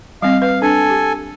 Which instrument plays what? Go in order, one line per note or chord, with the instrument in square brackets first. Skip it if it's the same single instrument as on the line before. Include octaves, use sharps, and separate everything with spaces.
[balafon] G3 C4 D#5 [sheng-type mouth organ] F5
[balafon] B4 [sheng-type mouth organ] F5
[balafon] D4 [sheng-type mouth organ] A4 G#5
[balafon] G4